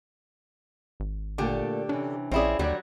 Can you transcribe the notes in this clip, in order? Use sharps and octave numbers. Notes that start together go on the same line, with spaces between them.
G#1
A#2 D3 A3 A#3 G4
C3 E3 C#4 D4
A#1 C4 C#4 E4 F4 G#4 D5
D#2 D3 D#3 F#3 G3 D5